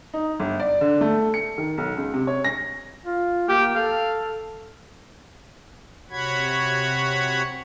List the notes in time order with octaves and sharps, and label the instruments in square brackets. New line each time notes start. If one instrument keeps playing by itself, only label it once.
[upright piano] D#4
G1
D5
D3
A3
C#7
D#3
B1
C#2
C3
C#5
A#6
[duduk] F4
[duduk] A#3 [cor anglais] G4
[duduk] A4 [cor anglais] F5
[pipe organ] C3 F#4 C#5 F#5 B5 G#6